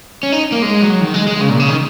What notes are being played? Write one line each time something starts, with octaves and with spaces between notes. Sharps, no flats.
C#4
D#4
A#3
G#3
F#3
D#3
G#3
G#3
C#3
A#2
C#3
D#3